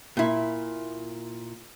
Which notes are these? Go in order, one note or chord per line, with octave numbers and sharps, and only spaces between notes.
A#2 E4